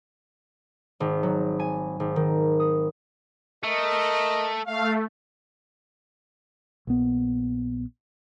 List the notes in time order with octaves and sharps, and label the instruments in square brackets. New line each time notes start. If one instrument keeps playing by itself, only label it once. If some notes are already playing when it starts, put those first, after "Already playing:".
[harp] G#1
F#3
G#5
G#1
D#3
D#6
[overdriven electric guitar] A3 [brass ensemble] A#4 D#5
[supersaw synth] A3 [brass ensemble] F5
[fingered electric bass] A#1 B3